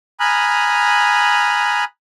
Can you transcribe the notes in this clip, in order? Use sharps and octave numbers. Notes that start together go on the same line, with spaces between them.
G#5 A#5 B5 D#6 F6 F#6